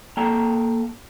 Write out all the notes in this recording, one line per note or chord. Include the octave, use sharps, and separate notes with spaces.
A#3 A4 G5 A5 A#5